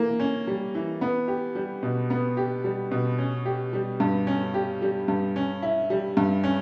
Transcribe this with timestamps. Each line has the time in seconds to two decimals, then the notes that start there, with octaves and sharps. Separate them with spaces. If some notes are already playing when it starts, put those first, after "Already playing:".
Already playing: E3 A#3
0.20 C#4
0.47 G3
0.75 E3
1.01 B3
1.28 G4
1.55 G3
1.83 B2
2.10 B3
2.37 G4
2.64 G3
2.91 B2
3.18 C#4
3.45 G4
3.73 G3
4.00 G2
4.27 C#4
4.54 G4
4.82 G3
5.08 G2
5.36 C#4
5.62 E4
5.90 G3
6.17 G2
6.44 C#4